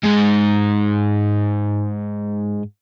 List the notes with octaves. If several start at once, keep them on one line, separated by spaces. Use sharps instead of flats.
G#2 G#3